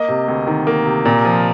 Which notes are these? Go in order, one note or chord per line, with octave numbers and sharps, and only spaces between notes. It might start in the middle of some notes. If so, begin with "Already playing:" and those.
Already playing: A#3 D#5
C3
D2
D#3
A#3
C3
A#2
F3